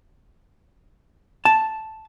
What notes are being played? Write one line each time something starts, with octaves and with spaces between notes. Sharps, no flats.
A5